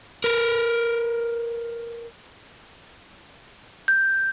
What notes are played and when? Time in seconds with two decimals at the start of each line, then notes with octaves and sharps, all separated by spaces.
0.24 A#4 B4
3.88 G6